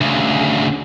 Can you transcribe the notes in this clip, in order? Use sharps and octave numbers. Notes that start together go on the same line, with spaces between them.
D2 C#3